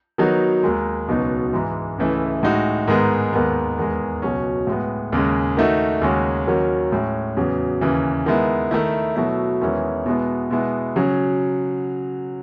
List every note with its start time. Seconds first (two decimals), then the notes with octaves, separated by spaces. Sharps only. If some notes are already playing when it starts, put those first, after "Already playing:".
0.18 D#3 F#3 B3 D#4
0.63 D#2 D#3 G#3
1.08 C#2 B2 F#3 B3 D#4
1.53 G#2 E3 G#3
1.98 C#2 C#3 E3 A3 E4
2.43 A2 G#3 D#4 F#4
2.87 G#2 D#3 G#3 B3
3.32 D#2 D#3 G#3 B3
3.78 E2 D#3 G#3
4.22 C#2 B2 F#3 C#4
4.67 A2 G#3 B3
5.12 D#2 C#3 G#3
5.57 D#3 A3 D#4 F#4
6.01 D#2 C#3 G#3 C#4 F#4
6.47 D#2 D#3 F#3 C#4 F#4
6.92 A2 G#3 C#4
7.37 E2 C#3 F#3
7.81 D#2 C#3 E3
8.26 D#3 G#3 B3 E4
8.71 D#3 A3 E4
9.16 B2 F#3 A3 E4
9.61 E2 D#3 G#3 C#4 E4
10.06 B2 G#3 B3 E4
10.50 B2 G#3 B3 E4
10.96 C#3 F#3